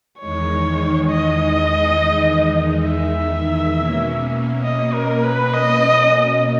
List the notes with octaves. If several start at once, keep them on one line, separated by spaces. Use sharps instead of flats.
E2 D#3 G#3 D#4 C#5
D#5
E5
B2 A#3 C#4
D#5
A#4
B4
D#5